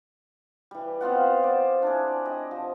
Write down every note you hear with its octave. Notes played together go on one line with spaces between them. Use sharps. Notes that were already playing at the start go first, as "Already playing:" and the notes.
E3 G3
B3 C4 F4 F#5
C5 D5
D4 E4 G#4
G4 D#5
F3